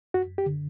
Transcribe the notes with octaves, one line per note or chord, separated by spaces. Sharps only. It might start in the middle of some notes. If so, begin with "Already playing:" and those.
F#2 F#4
G4
D3